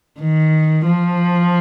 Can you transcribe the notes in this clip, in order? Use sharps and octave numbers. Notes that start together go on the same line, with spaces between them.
D#3
F3